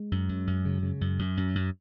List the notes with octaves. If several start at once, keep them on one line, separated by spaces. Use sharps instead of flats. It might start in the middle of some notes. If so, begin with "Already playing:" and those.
Already playing: G#3
F#2
F#2
F#2
C#3
C#3
F#2
F#2
F#2
F#2